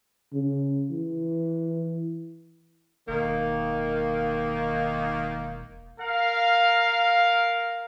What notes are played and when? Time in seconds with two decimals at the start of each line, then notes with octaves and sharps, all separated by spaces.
0.33 C#3
0.91 E3
3.08 E1 D#3 A#3
6.00 A#4 F5